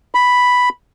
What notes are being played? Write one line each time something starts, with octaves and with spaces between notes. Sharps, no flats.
B5